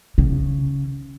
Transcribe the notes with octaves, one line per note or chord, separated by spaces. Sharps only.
C#3